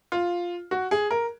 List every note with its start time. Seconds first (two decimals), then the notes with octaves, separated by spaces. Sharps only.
0.12 F4
0.71 F#4
0.91 G#4
1.11 A#4